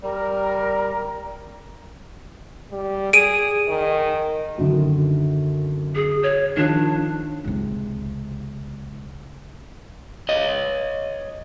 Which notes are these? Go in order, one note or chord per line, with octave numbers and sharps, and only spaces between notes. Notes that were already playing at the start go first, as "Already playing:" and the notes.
G3 A#4
G3
G#4 D7 D#7
D#3
F#2 D3 D#3
G#4
C#5
D#3 F3 D4 F4
C#2 C3
C#5 D#5